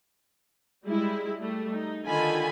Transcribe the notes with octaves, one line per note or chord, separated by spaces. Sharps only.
G3 G#3 E4
G3 A3
D#4
D3 D#3 F4 D#5 G#5 B5